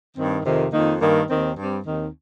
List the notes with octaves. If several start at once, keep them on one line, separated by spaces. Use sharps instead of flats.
G2 D#3 C4
F2 C3 D#3
F2 D#3 A#3 D#4
G2 D#3 A#3
D#2 D#3 C4
G2 G3 C4
D#2 D#3 C4 D#4